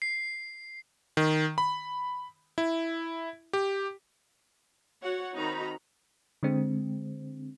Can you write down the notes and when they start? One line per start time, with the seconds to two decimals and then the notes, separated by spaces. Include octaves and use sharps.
0.02 C7
1.17 D#3
1.58 B5
2.58 E4
3.53 G4
5.02 F#4 C#5 F#5
5.35 D#3 C4 D#4 F#4 A#5 B5
6.43 D3 G#3 C4